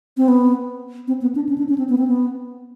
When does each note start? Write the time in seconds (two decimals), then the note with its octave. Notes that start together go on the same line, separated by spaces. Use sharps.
0.17 C4
0.28 B3
1.08 C4
1.22 B3
1.35 D4
1.49 C#4
1.58 D4
1.69 C#4
1.78 C4
1.89 B3
1.98 C4
2.07 B3